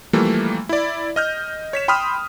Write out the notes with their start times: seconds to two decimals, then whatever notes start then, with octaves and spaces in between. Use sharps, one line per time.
0.13 E3 F3 G3 A3 A#3
0.69 E4 D5
1.16 D#5 F6 G6
1.73 C#5 B6 E7
1.88 G5 B5 C6 D#6 F6